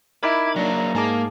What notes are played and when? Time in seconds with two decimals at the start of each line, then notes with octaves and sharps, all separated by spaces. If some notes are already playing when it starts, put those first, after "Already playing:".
0.23 D#4 E4 A#4 B5 D6 G#6
0.56 F#3 A#3 D4 A#5
0.95 G#2 A#3 G#4 A5 D6